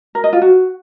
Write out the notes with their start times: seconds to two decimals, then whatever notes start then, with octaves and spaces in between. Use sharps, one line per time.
0.15 A#4
0.24 D#5
0.33 F4
0.42 F#4